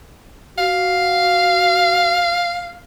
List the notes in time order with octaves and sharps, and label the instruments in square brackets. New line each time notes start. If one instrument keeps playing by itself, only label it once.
[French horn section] F#4 [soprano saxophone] F5